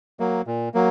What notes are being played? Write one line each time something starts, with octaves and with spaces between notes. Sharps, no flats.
F#3 A#3
A#2
F#3 A#3